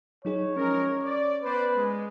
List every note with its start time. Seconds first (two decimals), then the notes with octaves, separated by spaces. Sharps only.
0.25 F#3 D#4 G#4 C#5
0.56 F3 G#3 C#4 A#4
1.04 D5
1.43 B3 B4 C5 D5
1.76 G#3